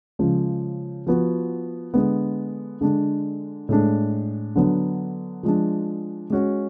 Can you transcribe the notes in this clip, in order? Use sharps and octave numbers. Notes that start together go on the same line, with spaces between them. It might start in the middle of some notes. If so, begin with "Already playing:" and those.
C#3 F3 G#3
F3 B3 F#4
D3 G#3 B3
D3 G#3 D4
A2 G#3 D4
D3 F#3 B3 D4
F3 G#3 D4
G#3 C#4 F#4